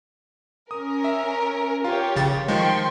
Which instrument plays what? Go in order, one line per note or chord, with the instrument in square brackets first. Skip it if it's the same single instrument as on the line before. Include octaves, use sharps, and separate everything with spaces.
[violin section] C#4 A#4 [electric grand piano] D#6
[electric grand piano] E5
[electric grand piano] F4 [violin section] G4 C#5
[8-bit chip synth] A1 C#3 A6
[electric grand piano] D#3 F3 [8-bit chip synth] G#3 [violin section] G5 C6 C#6